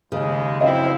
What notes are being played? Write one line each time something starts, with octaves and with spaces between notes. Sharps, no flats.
D#2 C#3 G#3
F#2 F3 C4 E4 D#5 F5